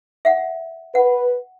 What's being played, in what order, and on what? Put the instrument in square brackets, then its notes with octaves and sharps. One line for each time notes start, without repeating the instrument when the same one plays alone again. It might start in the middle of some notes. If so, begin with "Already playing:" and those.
[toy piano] E5 F#5
[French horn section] B4 [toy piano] F#5